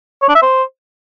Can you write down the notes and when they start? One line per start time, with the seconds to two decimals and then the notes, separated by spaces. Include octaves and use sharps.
0.22 C#5
0.29 D4
0.36 E5
0.42 C5